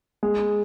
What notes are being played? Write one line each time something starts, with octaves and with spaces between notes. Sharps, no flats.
G#3